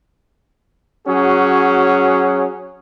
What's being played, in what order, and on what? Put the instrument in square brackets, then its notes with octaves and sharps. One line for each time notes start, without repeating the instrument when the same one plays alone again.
[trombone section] F#3 C#4 F#4 G#4